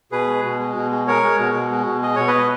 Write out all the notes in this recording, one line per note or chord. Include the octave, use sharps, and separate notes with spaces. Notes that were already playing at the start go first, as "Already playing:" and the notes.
B2 G#4 B4
G#3
B2
G#3
B2
G#3
G#3 A#4 C#5
G#3
B2
B2
G#3
B2
G#3 D#5
B2 C#5
B4 D#5
B2